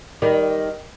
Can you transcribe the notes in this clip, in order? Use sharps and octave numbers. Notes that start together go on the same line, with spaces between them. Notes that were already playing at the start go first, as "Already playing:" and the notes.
D#3 G3